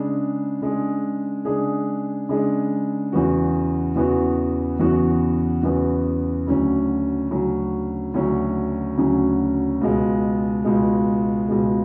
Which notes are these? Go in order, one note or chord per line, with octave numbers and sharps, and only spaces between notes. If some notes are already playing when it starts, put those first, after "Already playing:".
Already playing: C#3 G#3 D4 G#4
C#3 G#3 D4 G#4
C#3 G#3 D4 G#4
C#3 G#3 D4 G#4
E2 C#3 E3 B3 F#4
E2 C#3 E3 B3 F#4
E2 C#3 E3 B3 F#4
E2 C#3 E3 B3 F#4
D2 C#3 F#3 C#4
D2 C#3 F#3 C#4
D2 C#3 F#3 C#4
D2 C#3 F#3 C#4
C#2 B2 G#3
C#2 B2 G#3
C#2 B2 G#3